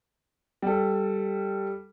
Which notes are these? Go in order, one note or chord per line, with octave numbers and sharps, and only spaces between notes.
G3 A4